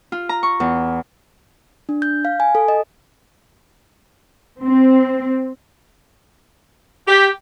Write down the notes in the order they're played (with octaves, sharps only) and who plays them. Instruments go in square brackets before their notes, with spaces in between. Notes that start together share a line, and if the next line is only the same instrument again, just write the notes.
[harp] F4
A#5
C#6
E2
[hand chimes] D4
G6
F5
G#5
A4
D#5
[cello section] C4
[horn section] G4